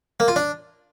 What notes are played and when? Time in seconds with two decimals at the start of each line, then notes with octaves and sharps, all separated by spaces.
0.20 A#3
0.28 F4
0.36 D4